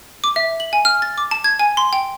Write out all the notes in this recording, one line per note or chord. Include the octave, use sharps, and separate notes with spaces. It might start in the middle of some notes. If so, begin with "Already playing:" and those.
D6
E5
F#7
G#5
F6
A6
D6
A5
G#6
G#5
C6
G5